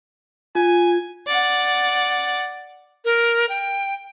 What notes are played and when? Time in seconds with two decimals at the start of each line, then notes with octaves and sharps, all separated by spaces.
0.55 F4 G#5
1.27 D5 F#5
3.05 A#4
3.49 G5